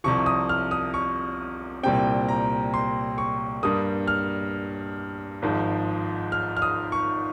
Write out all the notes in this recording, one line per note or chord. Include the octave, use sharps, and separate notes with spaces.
C2 C3 F3 C#6
D#6
F6
D#6
C#6
C2 A#2 G3 C4 G5
A#5
C6
C#6
G2 G3 A#3 D#6
F6
G#1 G#2 F3
F6
F6
D#6
C#6